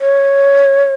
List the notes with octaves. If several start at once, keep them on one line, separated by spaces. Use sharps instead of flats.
C#5